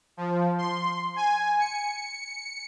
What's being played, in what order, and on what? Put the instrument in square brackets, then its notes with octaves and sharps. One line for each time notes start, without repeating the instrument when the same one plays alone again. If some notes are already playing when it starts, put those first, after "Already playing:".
[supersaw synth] F3
C6
G#5
C#7